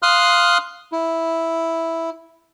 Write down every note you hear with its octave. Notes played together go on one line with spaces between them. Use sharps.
F5 C6 D#6 F6 F#6
E4